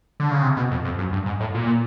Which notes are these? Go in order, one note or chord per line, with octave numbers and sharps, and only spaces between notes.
D3
C#3
C3
B2
F2
F2
F#2
G2
G#2
A2
A#2